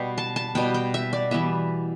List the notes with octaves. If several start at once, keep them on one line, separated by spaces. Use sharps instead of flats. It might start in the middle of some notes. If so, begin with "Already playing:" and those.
Already playing: B2 G3 B3 G5
A5
A5
B2 G3 B3 G5
G5
E5
D5
E3 G3 B3 E5